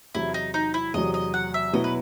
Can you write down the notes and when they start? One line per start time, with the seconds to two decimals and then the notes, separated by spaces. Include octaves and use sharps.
0.15 E2 C3 F#3 E4
0.34 D#4
0.54 D#4
0.74 E4
0.94 E2 C3 F#3 D#5
1.14 D#5
1.34 F#5
1.54 E5
1.73 B2 F#3 B3 E4 D#5
1.84 B4